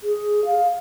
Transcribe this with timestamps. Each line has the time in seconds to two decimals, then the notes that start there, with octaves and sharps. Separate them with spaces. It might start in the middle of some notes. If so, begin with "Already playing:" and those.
0.03 G#4
0.45 F5